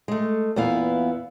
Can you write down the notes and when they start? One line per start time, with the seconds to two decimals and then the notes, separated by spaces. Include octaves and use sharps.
0.08 G#3 A3
0.56 E2 A#2 B3 E4 F5